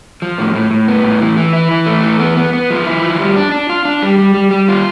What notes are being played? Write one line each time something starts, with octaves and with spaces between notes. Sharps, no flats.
F3
A2
A2
A2
B3
A2
E3
E3
E4
E3
A3
E3
B3
B3
B3
F3
E4
F3
G3
D4
D4
F4
D4
G3
G3
G3
G3
F4